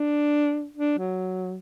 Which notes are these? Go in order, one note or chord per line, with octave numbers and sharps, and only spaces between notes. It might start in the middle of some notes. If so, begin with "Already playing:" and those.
Already playing: D4
D4
F#3